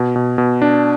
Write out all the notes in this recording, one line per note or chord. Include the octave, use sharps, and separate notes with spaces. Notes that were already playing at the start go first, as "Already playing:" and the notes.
Already playing: B2
B2
B2
D4